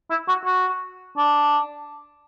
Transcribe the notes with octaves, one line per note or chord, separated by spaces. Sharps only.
E4
F#4
F#4
D4